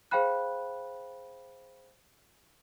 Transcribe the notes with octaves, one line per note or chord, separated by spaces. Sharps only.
G#4 C5 F5 G5 B5 F#6